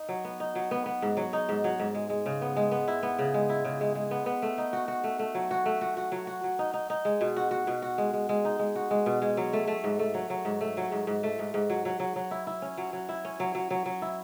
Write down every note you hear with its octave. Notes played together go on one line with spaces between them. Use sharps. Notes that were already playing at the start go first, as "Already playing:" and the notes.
Already playing: D#4
F#3
B3
D#4
F#3
B3
B3
G#2
F#3
D#4
G#2
F#3
G#2
G#3
G#3
C#3
B3
G#3
B3
E4
B3
C#3
G#3
E4
C#3
G#3
G#3
B3
B3
A3
D#4
F#4
F#4
A3
A3
F#3
F#4
A3
F#4
F#4
F#3
F#4
F#3
D#4
D#4
D#4
G#3
B2
F#4
F#4
B2
F#4
G#3
G#3
G#3
D#4
G#3
F#4
G#3
B2
G#3
F#3
A3
A3
G#2
A3
F#3
F#3
G#2
A3
F#3
G#2
G#2
A3
G#2
G#2
F#3
F#3
F#3
F#3
E4
E4
C#4
F#3
F#3
E4
C#4
F#3
F#3
F#3
F#3
E4